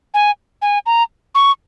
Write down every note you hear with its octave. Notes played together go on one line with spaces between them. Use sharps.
G#5
G#5
A#5
C#6